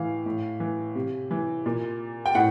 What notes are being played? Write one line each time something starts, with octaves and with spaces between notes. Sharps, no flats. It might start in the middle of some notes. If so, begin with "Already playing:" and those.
Already playing: A2 E3 F5
A2
E3
C3
E3
A#2
G5
A2 F#5